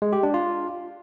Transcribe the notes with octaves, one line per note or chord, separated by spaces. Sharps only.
G#3
G4
D4
F4